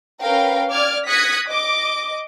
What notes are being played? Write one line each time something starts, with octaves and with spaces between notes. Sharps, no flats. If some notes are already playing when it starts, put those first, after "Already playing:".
C#4 A#4 B4 F5 G5
D5 D6 F6 G#6
D#6 F#6 G#6 A#6 B6 C#7
D#5 D6